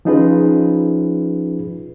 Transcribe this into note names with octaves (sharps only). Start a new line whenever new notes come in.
F3 C#4 D#4 F4 G#4 B4